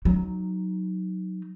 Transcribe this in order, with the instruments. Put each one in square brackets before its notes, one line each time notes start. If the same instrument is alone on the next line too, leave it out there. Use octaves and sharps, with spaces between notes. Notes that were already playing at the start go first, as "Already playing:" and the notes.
[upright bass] F#3 D#4